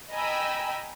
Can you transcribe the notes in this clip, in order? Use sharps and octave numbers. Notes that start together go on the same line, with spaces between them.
D#5 G5 G#5 A#5 B5 E6